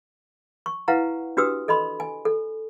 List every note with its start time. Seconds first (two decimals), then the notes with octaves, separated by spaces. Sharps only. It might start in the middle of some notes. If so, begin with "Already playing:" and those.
0.66 C#6
0.88 E4 B4 F5 F#5 A#5
1.37 D4 F#4 G4 B4 D#6 E6
1.68 A4 D#5 B5 C6
2.00 G#5
2.25 A4